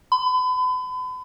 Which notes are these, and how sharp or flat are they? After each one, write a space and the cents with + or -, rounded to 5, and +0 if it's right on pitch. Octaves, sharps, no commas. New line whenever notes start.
B5 +40